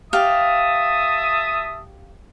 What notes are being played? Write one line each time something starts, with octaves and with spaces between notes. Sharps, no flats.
G4 E5 F5 A5 D#6